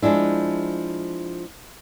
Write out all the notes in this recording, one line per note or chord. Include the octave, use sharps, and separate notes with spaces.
F3 G#3 D4 E4